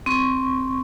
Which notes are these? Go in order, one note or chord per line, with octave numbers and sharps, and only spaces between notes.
C4 C#6